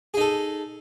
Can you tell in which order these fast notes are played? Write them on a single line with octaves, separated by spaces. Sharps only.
G#4 D#4 A4